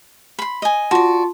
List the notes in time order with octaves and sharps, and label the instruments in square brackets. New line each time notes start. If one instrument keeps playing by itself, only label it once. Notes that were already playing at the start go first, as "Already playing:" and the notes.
[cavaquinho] B5 C6
D#5 G#5
[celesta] F4 A5 C6 [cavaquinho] F#4 D5